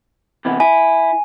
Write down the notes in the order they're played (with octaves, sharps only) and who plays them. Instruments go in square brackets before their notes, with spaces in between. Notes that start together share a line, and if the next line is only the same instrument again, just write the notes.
[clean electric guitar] C3 E3 B3
[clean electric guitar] E4 [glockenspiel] G#5